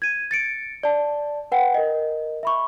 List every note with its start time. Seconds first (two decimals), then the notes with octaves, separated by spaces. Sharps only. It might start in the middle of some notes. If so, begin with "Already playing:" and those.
0.02 G#6 D#7
0.31 A6 C#7 D7
0.83 D5 A5
1.52 B4 F#5 G5
1.74 A#4 D#5
2.43 E5 B5 C#6